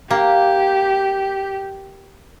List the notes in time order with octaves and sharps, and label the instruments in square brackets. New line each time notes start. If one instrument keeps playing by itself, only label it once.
[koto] A#3 [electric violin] G4